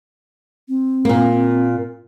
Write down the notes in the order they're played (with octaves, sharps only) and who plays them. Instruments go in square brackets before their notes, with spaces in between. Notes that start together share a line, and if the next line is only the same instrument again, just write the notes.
[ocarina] C4
[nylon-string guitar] A#2 A#3